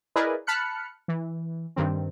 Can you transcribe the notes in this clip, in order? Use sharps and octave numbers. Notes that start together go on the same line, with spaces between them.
E4 G#4 A#4 B4 D5 D#5
A5 B5 F6 F#6 C#7
E3
G2 D#3 C4